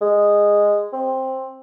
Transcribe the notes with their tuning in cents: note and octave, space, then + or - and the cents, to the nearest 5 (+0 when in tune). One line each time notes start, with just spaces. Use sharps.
G#3 -10
C4 +10